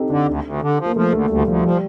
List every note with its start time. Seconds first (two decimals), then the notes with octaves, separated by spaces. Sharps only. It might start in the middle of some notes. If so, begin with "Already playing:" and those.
Already playing: C4 D#4 G4 A4
0.10 D3 D4
0.27 D2
0.44 D2
0.62 D3
0.79 F3
0.86 A#3
0.96 F3 A3
1.13 D2 A3
1.30 D2 G3
1.47 D2 F3
1.65 F3 G3